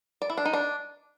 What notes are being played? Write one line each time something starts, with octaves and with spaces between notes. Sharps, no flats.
D5
E4
D4
D#4
D4